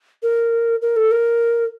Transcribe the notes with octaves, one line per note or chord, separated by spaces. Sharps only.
A#4
A#4
A4
A#4